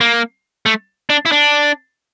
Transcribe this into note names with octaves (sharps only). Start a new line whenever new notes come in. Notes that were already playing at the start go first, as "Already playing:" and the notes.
A#3
A3
D4
E4
D4